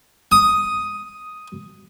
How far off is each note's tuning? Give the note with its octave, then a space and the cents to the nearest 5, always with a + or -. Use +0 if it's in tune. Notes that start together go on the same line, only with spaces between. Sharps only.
D#6 +5